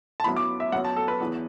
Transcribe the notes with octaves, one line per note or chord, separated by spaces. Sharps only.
A5
F#2 F#3 B3 E4 B5
D6
E5
F#2 F#3 B3 F#5
A5
A4
B4
E2 E3 B3